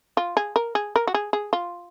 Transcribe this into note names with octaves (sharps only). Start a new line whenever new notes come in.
F4
G#4
A#4
G#4
A#4
F#4
G#4
G#4
F4